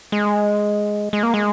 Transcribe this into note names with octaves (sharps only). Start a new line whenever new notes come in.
G#3
G#3
A#3
G#3